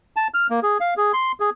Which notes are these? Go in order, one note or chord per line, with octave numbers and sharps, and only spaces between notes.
A5
F6
A#3
G#4
F5
G#4
C6
G#4